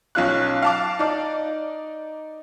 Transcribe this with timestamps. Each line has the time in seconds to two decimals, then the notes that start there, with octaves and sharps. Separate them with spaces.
0.15 B1 C#4 F4 F#6
0.62 F5 A5 D6
0.99 D#4 D5